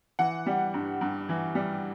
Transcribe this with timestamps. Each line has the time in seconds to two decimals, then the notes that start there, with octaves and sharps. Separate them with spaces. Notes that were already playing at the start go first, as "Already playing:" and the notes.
0.19 E3 F#5
0.46 G3
0.74 G2
1.01 G2
1.29 E3
1.55 G3